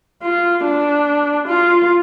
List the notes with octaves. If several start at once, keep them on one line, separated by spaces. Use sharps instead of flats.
F4
D4
F4